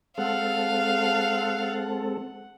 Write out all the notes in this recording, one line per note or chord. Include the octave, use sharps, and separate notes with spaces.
G#3 C4 A4 F5 F#5